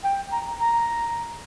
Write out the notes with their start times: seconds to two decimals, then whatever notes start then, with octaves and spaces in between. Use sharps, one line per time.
0.04 G5
0.32 A#5
0.59 A#5